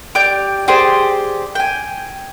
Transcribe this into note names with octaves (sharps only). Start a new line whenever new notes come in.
G4 D5 G6
G4 G#4 C5 D5
G5 G#5